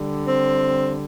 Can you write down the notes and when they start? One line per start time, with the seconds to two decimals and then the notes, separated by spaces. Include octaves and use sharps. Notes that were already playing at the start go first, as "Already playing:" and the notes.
Already playing: D3 G3
0.28 C4